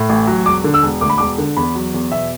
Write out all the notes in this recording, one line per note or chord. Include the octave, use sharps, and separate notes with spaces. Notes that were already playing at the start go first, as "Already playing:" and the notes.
Already playing: A2
A1
F#3
E1 D6
D3
E6
E1
D2 D6
B5
E1 D6
D3
E2 B5
F#3
E2
B2 E5